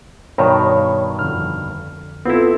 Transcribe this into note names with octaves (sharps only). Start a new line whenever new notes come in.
G2 B2 D#3 C#5 A#5
C#5
F2 D3 F6
B3 C4 E4 F4 A4